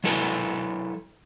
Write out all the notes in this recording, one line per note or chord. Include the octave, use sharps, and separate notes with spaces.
F#3 E4 A4 B4 G#5